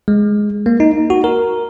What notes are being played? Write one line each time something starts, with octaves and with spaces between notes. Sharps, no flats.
G#3
A#3
D#4
F#4
A#4